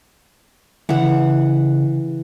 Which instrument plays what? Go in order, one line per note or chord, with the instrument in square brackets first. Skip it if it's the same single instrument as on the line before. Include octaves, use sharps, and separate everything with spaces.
[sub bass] C#3 [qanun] E3 F#5